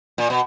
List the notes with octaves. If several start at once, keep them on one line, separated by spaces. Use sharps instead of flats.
A#2
B2